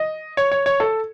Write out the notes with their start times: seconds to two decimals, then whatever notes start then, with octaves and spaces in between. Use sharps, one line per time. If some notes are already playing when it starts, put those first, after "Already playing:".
Already playing: D#5
0.37 C#5
0.51 C#5
0.66 C#5
0.80 A4